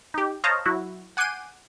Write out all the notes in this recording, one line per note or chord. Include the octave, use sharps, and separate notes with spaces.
D#4 G4
C5 C#5 D#5 F5 A5 A#5
F#3 E4 F#4
F#5 G#5 D6 G6 C7 D#7